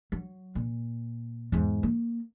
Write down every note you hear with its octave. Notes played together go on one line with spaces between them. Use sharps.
F#3
A#2
E2 G#2
A#3